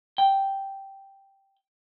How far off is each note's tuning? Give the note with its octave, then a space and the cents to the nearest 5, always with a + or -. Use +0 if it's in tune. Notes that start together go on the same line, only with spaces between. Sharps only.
G5 -5